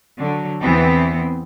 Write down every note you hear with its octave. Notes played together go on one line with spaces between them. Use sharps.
D3 F#3
E2 E3 B3 C4